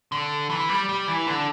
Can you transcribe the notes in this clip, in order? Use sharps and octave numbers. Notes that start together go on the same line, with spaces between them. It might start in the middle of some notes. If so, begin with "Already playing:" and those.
D3
E3
G3
G3
E3
D3